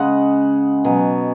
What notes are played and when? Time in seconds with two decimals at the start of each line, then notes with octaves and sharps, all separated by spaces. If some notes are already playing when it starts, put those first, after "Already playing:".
Already playing: C#3 G#3 D#5 F#5
0.84 B2 F#3 G#5